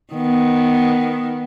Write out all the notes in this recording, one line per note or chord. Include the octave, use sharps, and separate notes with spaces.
D#3 B3